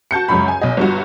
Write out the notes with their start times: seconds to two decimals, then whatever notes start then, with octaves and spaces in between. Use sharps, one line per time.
0.11 F#4 A5 G6 C#7
0.28 C#2 F#2 C#4 B5
0.48 G#5
0.61 B1 D#5
0.77 G1 G2 F#4